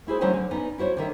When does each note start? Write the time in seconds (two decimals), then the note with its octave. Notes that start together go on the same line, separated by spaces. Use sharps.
0.07 A3 E4 G#4 C5
0.21 D3 F#3 C#4 C5 E5 G#5
0.34 D3
0.51 B3 C#4 D#4 D5
0.78 E4 F#4 C5 C#5
0.97 D3 D#3 E5